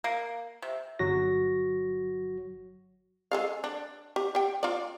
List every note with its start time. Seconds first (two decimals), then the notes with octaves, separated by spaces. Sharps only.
0.04 A#3
0.62 C3
0.99 G1 F#3 F#4 A#6
3.31 G#3 A4 F5
3.64 D4
4.16 G4
4.35 G4 G5
4.63 F4 D5